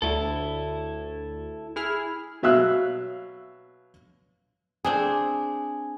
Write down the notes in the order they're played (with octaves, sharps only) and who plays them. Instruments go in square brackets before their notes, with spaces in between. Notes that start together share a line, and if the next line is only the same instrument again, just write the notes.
[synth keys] D2 [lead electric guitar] E4 A4
[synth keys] E4 G#4 F6
[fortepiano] B2 F#3 E5 F5 E6 F#6
[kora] C4 D4 G#4 [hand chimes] G#5